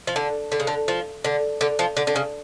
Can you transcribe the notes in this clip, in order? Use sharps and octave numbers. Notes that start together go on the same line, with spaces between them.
F3
D3
D3
C#3
D3
F3
D3
D3
F3
D3
D3
C#3